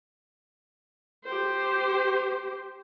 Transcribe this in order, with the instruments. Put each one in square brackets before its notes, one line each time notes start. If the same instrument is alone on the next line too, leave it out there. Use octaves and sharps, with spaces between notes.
[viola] G4 C5